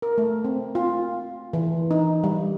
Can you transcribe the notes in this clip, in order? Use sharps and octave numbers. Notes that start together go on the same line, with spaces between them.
A#4
A3
C4
F4
E3
D#4
G3